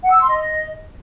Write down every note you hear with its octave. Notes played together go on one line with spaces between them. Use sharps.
F#5
E6
C6
D#5